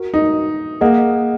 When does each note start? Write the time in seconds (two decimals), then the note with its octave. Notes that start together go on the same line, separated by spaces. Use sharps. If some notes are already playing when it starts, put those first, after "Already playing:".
Already playing: F#4 A#4
0.14 D#4
0.81 A#3 G#4 D#5 F#5